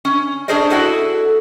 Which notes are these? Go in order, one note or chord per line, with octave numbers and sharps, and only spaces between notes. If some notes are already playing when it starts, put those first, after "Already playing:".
C#4
C#4 D4 G#4 C5 D5 D#5
E4 F#4 G#4 A4